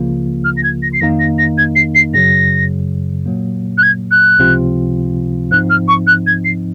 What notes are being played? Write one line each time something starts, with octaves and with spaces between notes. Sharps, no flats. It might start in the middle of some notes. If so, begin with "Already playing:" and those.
Already playing: C#2 C#3 F3 A#3 F4
F6
A#6
G#6
A#6
C7
F2 D#3 A#3 D#4 A#6
A#6
A#6
G#6
C7
C7
F#2 C#3 F#3 A#6
A#2 F#3 A#3
F#6
G#6
F#6
C#2 C3 F3 C4 F4
G#2 F3 C4 D#4 F#6
F6
C#6
F#6
G#6
C7